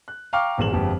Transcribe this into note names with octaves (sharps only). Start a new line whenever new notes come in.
F#6
F5 G5 A#5 C#6 D6 F6
D#1 G#1 E2 G#4 E7 F#7
G1 F2 G#3 G4